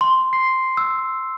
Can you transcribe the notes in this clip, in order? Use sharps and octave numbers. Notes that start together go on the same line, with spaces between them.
C6
C7
E6